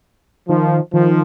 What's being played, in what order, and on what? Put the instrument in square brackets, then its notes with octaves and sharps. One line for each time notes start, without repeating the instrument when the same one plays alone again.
[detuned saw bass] D#3 [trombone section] F3
[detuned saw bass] D#3 [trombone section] F3